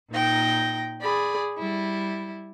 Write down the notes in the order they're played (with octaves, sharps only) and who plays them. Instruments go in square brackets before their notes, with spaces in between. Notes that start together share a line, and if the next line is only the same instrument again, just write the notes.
[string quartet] A#2 D#4 G5 A#6
G#4 D5 B5
G3 E4